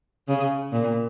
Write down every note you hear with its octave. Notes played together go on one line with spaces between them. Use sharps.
C#3
A#2